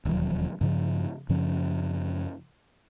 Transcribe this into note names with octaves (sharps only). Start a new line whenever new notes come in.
E1 D#2 F3 F#3
G2 C#3 F3
F#2 C#3 F3 C#4